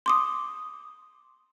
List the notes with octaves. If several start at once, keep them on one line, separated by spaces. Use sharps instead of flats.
C6 D6 D#6